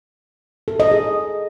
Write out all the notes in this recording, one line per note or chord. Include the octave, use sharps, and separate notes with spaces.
A4
D#5
G#4